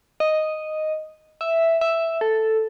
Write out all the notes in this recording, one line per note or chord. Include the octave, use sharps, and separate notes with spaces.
D#5
E5
E5
A4